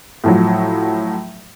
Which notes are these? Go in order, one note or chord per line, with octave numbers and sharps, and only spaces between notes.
A2 F3 F#3